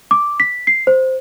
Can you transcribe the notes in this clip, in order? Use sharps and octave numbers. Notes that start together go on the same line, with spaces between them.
D6
B6
C7
C5